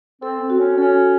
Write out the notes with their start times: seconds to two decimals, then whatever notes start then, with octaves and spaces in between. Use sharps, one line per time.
0.22 C4 A4
0.41 C4
0.50 F#4
0.59 C#4
0.78 C#4 A4